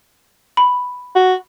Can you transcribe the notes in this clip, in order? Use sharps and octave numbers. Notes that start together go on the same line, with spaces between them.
B5
F#4